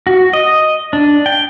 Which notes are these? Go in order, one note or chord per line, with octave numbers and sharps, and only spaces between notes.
F#4
D#5
D4
G5